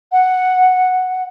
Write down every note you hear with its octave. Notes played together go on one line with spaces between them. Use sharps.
F#5